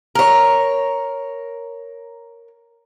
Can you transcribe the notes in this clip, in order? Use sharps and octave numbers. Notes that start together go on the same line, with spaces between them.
A#4 C#5